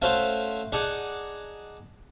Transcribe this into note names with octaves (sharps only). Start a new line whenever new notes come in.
A3 C#4 F#4 C5 F5 A5
D#4 G#4 D5 F#5 A5